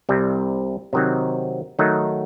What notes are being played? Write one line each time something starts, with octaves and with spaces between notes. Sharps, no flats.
C2 C3 G3 C4
C3 D#3 F#3 C4 D#4
D#3 F#3 A3 D#4